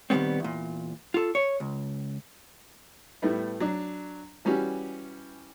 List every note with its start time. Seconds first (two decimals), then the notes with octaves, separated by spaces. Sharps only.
0.10 A#2 D#3 G3 G#3 B3 C4
0.40 E2 A#2
1.14 F4 A4
1.35 C#5
1.60 C#2
3.22 A2 G3 A3 B3
3.60 F#3 D4
4.45 E3 G3 C#4 F#4 G4